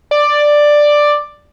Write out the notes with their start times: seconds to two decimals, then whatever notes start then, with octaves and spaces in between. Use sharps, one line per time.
0.11 D5